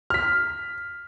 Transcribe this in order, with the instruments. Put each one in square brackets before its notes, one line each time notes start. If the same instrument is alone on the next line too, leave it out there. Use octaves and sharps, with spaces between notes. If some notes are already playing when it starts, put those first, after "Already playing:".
[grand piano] F6 B6